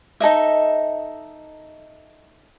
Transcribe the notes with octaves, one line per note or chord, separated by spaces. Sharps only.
D#4 A4 D#5 E5